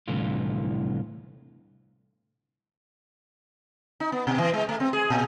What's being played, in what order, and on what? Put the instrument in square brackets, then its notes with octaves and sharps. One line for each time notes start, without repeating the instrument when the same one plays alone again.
[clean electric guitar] C2 A2 D3 E3 F4
[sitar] D#4
B3
B2
E3
G#3
A3
C4
G#4
A#2